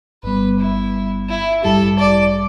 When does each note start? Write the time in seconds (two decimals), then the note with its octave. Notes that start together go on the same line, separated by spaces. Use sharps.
0.23 G1 G2 G3 B3 B4
0.58 E4
1.28 E4
1.63 A1 G2 G3 E4 G4 A4
1.98 D5